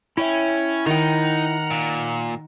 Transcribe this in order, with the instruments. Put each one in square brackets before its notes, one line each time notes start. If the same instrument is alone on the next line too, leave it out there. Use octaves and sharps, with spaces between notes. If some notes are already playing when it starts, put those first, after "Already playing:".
[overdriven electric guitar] C#4 [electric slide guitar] E4 C#5 E5 [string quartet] G5
[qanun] D#3 G5 [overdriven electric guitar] D#4 [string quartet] F#5 A#5 F6
[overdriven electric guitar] A#2